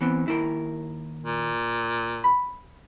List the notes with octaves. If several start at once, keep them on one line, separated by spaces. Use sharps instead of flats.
E3 B3 C4
D#2 E4 A#4
A#2
B5